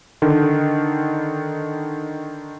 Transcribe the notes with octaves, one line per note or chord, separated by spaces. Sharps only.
D3 D#3